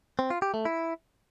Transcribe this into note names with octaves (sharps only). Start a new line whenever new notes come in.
C4
F4
G4
A3
E4